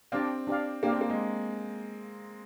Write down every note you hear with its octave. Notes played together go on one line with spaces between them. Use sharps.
C4 D4 G4 D5 F5
D4 G4 D5 F5
A#3 D4 G4 D5 F5
C4
A#3
G#3